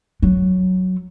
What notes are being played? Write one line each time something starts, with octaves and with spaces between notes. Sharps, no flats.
F#3